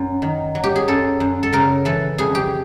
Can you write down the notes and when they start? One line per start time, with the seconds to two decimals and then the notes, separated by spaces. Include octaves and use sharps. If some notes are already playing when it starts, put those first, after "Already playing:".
Already playing: F#2
0.22 D#3
0.55 F#3
0.64 G4
0.76 G#4
0.88 F#2 A4
1.20 F#2
1.43 A4
1.53 C#3 A#4
1.85 E3 A4
2.18 F2 G#4
2.35 G4